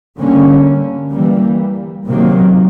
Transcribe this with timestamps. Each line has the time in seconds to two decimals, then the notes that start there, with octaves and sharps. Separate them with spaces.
0.18 D3 G3 A#3 C#4
1.12 E3 G3 A#3
2.07 C3 D#3 F#3 A#3